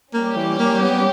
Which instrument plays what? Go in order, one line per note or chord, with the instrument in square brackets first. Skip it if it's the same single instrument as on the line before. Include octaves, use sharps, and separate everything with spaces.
[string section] G3 C#4 G4 [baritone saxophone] A#3
[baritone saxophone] E3
A#3
B3